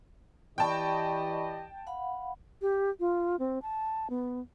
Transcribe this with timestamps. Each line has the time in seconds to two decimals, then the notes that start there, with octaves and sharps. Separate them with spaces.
0.58 E3 G4 D5 D#5 G5 A5 B5 C#6
1.87 F5 F#5 B5
2.62 G4
3.00 F4
3.39 C4
3.62 A5
4.10 B3